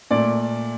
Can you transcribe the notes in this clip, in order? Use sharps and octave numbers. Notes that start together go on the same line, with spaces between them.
A#2 A3 D5